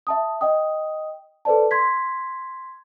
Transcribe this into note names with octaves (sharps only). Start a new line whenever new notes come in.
E5 A5 D#6
D#5 G5 D#6
A4 B4 C5 D5 A5
C6 G#6 B6